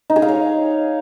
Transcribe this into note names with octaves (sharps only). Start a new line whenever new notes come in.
D#4
G#4
F5
C#5